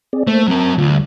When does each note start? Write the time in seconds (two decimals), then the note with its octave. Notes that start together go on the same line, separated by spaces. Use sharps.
0.13 C4 G#4 D5
0.27 A3 A#3 C5
0.48 F#3 C4 A#4 A5
0.78 D2 F4
0.91 G3